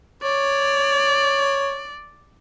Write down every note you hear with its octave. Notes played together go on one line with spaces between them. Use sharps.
C#5 D5